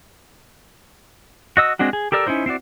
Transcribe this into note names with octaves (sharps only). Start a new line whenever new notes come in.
F#4 D#5 E6
G#3 C4 D4 F#4
G#4
G4 A4 A#4 D5 E6
C#4 D#4 E4 C5
C4 E4 F#4 D5